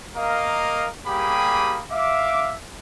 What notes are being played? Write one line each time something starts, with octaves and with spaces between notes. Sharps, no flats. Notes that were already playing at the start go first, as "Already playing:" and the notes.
A#3 A#4 D#5 F5
G3 A#3 G4 G#4 B5 D#6
E5 F5 D6